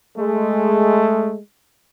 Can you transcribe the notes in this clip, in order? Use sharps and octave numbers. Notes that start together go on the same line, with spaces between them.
G#3 A3